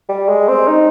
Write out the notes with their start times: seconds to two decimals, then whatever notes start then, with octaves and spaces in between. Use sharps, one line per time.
0.09 G3
0.29 G#3
0.48 C4
0.68 D#4